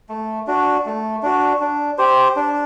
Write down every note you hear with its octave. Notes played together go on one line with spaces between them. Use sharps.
A3
D4 F#4
A3
D4 F#4
D4
G4 C5
D4